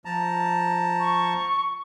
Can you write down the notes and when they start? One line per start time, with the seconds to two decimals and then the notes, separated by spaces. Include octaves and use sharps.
0.05 F3 A5 A#5
1.00 C#6